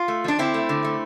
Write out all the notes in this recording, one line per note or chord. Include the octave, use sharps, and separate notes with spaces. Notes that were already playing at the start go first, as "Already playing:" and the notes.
Already playing: F4
A3
F3 D4
D3 C4 E4
A3
D3
A3